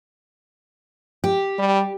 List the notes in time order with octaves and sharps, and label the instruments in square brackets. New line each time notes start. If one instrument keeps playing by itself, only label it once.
[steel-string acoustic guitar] G4
[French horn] G3